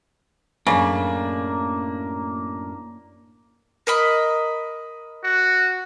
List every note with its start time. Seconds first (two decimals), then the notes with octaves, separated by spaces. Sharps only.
0.67 F#2 A2 C#3 A#3 D4
3.87 A#4 D#5 B5
5.24 F#4